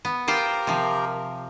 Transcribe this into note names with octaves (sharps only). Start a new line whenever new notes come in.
B3
F4 G4 A#4 C5 G5
C3 F3